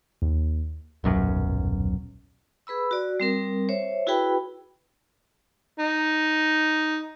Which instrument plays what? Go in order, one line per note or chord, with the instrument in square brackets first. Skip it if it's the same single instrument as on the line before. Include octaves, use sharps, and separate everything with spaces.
[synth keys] D#2
[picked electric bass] D#1 B1 F#2
[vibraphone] G#4 B4 B5 E6
F#4 D5
G3 C4 A#4
C5 C#5 E5
E4 F#4 G#4 B4 G5 B5
[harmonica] D#4